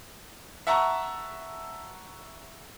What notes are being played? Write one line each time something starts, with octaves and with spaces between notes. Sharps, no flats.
E5 F#5 A5 A#5 C#6